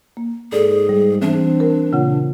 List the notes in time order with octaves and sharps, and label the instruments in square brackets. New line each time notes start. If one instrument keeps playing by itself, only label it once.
[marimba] A#3
[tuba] G#2 [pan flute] G#4 [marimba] A4 D5
[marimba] G3
[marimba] E3 [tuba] C4 [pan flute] D4
[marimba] A#4
[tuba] A#2 [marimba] C#3 F4 F#5